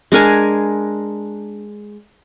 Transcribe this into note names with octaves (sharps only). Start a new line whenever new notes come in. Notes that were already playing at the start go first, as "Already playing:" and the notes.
G#3 D4 A#4 G#5